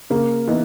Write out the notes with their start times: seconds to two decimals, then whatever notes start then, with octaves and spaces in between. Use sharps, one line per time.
0.10 C#3 A#3
0.47 E3 B3 D#4 A#4